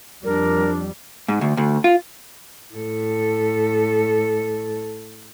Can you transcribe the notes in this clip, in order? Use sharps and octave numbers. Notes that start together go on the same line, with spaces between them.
F2 G3 D4 A#4
G#2
D2
D2
F4
A2 A4